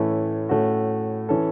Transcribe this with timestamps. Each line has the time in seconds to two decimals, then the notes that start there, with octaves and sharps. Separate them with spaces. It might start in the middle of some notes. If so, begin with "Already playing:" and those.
Already playing: A2 E3 A3 C#4 E4
0.49 A2 A3 C#4 F#4
1.29 E3 C#4 A4